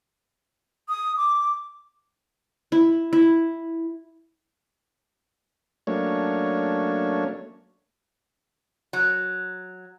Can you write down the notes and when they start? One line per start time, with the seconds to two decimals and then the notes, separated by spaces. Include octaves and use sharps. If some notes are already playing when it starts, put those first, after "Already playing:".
0.89 D#6
1.17 D6
2.72 E4
3.13 E4
5.87 F#3 A3 A#3 C#4 D4 C#5
8.93 F#3